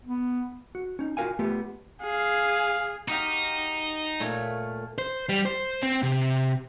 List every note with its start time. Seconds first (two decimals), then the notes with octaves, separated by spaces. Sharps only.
0.05 B3
0.75 F#4
0.99 C#4 D#4
1.17 F4 F#4 G#4 A#4 F5 G#5
1.39 A3 B3 F4 G4
2.02 G#4 F5
3.08 D#4 F#4 G4 F5
4.20 A#2 A3 C#5
4.98 C5
5.29 G3
5.45 C5
5.83 C4
6.03 C3